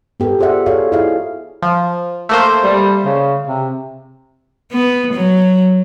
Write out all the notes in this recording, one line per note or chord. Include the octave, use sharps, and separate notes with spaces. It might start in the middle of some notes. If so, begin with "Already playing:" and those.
B3 G4 A4 A#4
F4 G#4 C5 D5 E5 F#5
F#4 G#4 A4 C#5 D5 F5
E4 F4 G#4 C5 D#5 F5
F3
A3 A#3 C5
G3
C#3
C3
B3
F#3